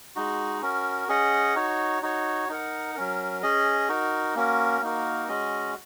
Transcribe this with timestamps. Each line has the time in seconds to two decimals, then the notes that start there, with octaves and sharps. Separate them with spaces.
0.16 G#3 D#4 F#4
0.62 C#4 F#4 A#4
1.09 C#4 G#4 D#5 F#5
1.55 D#4 F#4 C#5
2.02 D#4 F#4 C#5
2.49 D#4 A#4 F#5
2.95 F#3 C#4 A#4
3.43 C#4 G#4 D#5
3.88 D#4 F#4 A#4
4.35 A#3 C#4 F#4 A#4
4.81 A#3 D#4 F#4 A#4
5.28 G#3 C#4 F#4 D#5